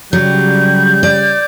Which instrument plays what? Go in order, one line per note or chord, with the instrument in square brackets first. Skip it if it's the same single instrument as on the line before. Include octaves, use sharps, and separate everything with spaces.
[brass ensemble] C#3 G3 [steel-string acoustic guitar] F#3 [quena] G6
[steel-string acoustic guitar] D5